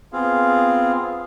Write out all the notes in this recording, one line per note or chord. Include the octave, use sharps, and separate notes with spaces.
B3 C4 F4 G#4 F5